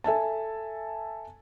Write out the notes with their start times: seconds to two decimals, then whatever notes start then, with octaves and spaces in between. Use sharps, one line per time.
0.04 A4 E5 G#5 A5